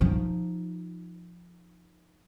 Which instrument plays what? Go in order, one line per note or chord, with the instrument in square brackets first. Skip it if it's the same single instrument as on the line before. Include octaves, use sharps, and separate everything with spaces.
[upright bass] F3 D#4